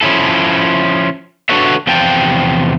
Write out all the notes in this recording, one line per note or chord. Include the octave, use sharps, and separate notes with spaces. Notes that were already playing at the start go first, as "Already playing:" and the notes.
F3 C#4 E4 A4
D4 F#4 A4 B4 C#5 E5
E2 C3 F3 G5 A5